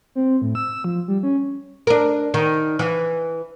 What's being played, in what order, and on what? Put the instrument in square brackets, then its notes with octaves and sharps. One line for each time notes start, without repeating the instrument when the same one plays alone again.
[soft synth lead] C4
A2
E6
F3
G3
C#4
[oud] D4 A#4
D#3
E3